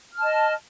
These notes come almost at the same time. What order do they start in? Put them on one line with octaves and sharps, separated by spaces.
F6 A5 D#5